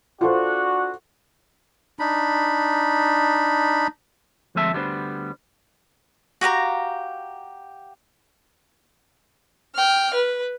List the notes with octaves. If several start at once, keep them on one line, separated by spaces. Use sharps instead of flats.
D4 F4 F#4 A4 C5
D4 D#4 B5
D2 F3 G#3 C4 E5 A5
D2 G3 B3 D4 C5
F#4 G4 F5 A#5
G5 F6
B4